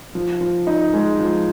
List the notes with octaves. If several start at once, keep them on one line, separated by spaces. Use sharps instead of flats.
F3
F3
D#4
G#3
F3